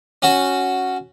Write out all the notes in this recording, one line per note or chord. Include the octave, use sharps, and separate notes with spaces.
C#4 F#4